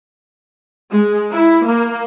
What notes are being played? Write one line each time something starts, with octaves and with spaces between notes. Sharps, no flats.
G#3
E4
A#3